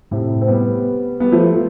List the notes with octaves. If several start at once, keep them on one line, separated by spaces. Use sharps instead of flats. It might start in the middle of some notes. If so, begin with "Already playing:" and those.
A2 C3
C4
G3 B3
G3 B3
F3 A3